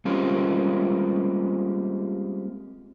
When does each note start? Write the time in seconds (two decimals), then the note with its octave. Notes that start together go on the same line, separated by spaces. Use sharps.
0.05 G3 G#3 A#3 C4 C#4 F4